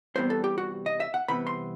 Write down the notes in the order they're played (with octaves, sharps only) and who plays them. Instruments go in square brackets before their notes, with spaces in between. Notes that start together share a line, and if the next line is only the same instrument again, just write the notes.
[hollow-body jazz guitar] C2 C3 E3 G3 B3 C5
A4
G4
F#4
D#5
E5
F#5
C2 C3 E3 B3 B5
C6